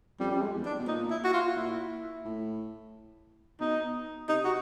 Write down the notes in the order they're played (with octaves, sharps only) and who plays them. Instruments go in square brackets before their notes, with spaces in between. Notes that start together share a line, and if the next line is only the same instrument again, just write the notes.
[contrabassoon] F2 [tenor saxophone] G3
[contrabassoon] F#2 [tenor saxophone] G3
[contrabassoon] F2
[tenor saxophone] G#3
[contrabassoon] E2
[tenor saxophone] D4
[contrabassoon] B2
[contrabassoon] A#2 [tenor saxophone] D#4
[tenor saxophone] E4
F#4
F4
[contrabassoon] A#2 [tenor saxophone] E4
[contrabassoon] A2
[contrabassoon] B2 [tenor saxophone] D#4
[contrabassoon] C3 [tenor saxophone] D#4
[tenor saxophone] F#4